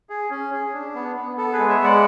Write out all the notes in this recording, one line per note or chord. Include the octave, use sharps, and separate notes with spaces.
G#4
C#4
G#4
D4
B3
B3
B3 A4
G#4 B4
G#3
C#5 E5
G#3
D5 F#5